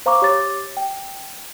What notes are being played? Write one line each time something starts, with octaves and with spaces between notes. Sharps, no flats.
C5 F5 A#5 C#6 D6
G4 C#5 D6 A6
G5